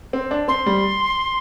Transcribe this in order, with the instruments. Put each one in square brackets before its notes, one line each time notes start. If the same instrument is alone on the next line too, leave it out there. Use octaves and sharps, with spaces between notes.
[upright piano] C4
D4
[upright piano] C4 [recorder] C6
[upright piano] G3